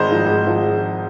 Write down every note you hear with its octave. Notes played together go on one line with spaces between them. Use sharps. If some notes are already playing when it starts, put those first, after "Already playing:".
Already playing: G#1 C5 D#5
G#2 F3
G#1
G#2 F3